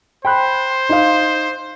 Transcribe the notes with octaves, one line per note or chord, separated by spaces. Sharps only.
C5 G5 B5 F#6
D#4 F5